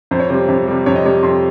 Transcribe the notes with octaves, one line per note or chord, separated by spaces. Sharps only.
F2 C5
C#5
C3 G3 C5
F2
C3 G3
F2 C#5
D#5
C3 G3 C#5
F2 C6